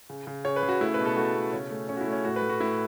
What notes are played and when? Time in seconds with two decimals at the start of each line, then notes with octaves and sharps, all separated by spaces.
0.09 C#3
0.27 C#3
0.45 C#3 C#5
0.56 B4
0.63 C#3
0.69 F#4
0.81 A3 E4
0.94 B2 B4
1.05 A4
1.17 A3 F#4
1.35 B2
1.53 C#3 C#4
1.71 A3
1.89 C#3 C#4
1.97 F#4
2.01 E4
2.07 A3
2.12 C#4
2.25 A2 F#4
2.36 B4
2.42 A3
2.49 F#4
2.60 A2 E4